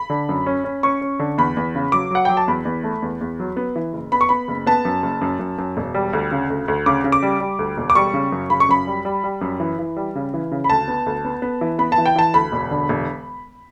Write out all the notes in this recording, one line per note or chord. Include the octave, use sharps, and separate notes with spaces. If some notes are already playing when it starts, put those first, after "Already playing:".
Already playing: B5
D3
F#2
C#4
C#4
C#4 C#6
C#4
D3
E2 B5
E2
C#3
F#3 D6
F#3 F#5
F#3 G5
A5
E2 B5
E2
A3
E2
E2
F#3
B3
E3
F#1
B3 B5
C#6
B3 B5
F#1
B3 A5
F#2
F#1
F#2
F#2
F#2
E1
G3
D2
C#3
D2
D2
C#3 D6
C#3
D6
G3
G3
D2
E1
D6
G3 C#6
C#3
F#2
C#3 B5
C#6
F#2 B5
G3
G3
G3
F#2
E3
E3
G3
C#3
E3
C#3
B5
D2 A5
B3
D2
B3
B3
E3
B3 B5
A5
E3
G5
E3 A5
D2 B5
E1
D3
E1